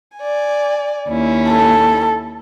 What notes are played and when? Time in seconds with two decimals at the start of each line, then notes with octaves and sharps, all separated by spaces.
0.17 D5 G#5
1.08 D#2 C#4 E4
1.49 A4